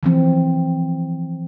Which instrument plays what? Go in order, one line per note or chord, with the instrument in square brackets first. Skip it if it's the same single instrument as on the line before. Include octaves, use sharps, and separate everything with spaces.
[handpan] E3 F3 C4